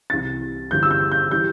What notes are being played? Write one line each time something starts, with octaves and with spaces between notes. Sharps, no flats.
C2 C3 E3 A6
G1 G2 E3 G3 G6
E6
G6
G6
E3 G3 G6